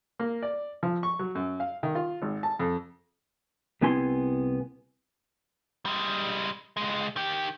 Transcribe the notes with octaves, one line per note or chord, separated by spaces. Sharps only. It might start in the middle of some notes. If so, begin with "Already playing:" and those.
A#3
D5
F3
C#6
F#3
F#2
F5
D#3
F4
G#1
A5
F2
C2 B3 C4 E4 G#5 C6
G3 G#3
C#2 G#3
D#3 G4